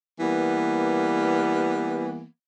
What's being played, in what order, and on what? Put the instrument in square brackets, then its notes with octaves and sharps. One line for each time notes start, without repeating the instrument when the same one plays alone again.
[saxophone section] E3 G3 A#3 B3